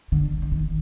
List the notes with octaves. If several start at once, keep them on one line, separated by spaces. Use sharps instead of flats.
D3
E3
D#3